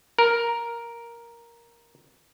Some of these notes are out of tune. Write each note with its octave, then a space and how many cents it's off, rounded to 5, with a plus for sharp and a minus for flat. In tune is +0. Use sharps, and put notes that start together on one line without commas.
A#4 +5